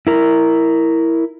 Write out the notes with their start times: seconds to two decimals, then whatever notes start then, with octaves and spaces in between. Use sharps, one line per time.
0.07 E4 A#4